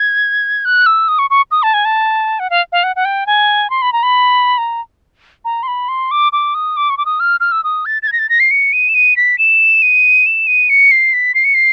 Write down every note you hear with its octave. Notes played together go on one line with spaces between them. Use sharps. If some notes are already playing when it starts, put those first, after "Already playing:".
Already playing: G#6
F#6
E6
D#6
C#6
C#6
D#6
A5
G#5
A5
F#5
F5
F5
F#5
F#5
G5
G#5
C6
B5
A#5
B5
A#5
A#5
C6
B5
C6
D6
D6
D#6
D6
C#6
D6
D#6
F6
F6
E6
D#6
A6
A6
G#6
A#6
A6
A#6
C7
C#7
D#7
E7
D#7
B6
E7
D#7
E7
D#7
C#7
C7
B6
C7
C#7
C7